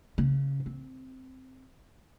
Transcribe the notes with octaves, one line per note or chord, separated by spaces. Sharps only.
C#3
C4